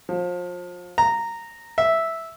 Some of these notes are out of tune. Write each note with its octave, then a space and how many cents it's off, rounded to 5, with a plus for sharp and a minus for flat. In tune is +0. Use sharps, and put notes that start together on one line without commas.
F3 +30
A#5 -10
E5 -5